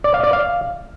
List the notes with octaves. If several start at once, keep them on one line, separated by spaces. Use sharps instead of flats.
D5
F5
D5
F5